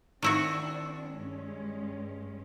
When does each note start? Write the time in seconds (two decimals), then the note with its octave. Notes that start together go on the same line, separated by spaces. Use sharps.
0.22 D#3 C4 D4 E4 F#4
1.11 G2 G#3 C#4